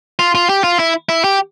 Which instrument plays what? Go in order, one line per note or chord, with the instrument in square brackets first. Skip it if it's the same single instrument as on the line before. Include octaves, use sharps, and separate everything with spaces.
[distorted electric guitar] F4
F4
G4
F4
E4
E4
G4